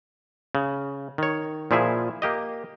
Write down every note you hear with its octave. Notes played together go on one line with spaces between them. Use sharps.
C#3
D#3 C#5
A#2 F3 E4 G#4 E5
A#3 G4 D#5